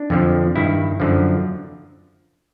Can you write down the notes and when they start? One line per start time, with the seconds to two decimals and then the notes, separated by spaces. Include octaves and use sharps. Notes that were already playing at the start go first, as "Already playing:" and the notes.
Already playing: D4
0.10 F2 D3 F3
0.56 G2 D#3 E4
1.00 F#2 D3 F3